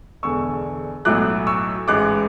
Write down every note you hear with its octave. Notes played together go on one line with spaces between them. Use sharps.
E1 E2 D3 C#6 E6
B1 A2 F#3 A3 D6 F#6
C#6 E6
A1 G#2 G#3 D6 F#6